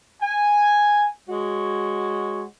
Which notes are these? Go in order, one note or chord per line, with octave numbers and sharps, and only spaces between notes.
G#5
G#3 F#4 C#5